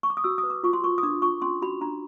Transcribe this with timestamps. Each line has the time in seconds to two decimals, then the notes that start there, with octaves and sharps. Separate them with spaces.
0.03 C#6
0.10 D6
0.17 D#6
0.24 F#4 E6
0.38 D#6
0.43 B4
0.50 D6
0.63 F4 C#6
0.73 C6
0.84 A#4 C#6
0.98 D#6
1.03 D4 D6
1.22 F4 C#6
1.42 C#4 C6
1.62 F#4 B5
1.81 D4 A#5